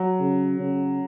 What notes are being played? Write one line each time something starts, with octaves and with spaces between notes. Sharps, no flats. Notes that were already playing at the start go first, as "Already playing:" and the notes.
Already playing: F#3
C#3
C#3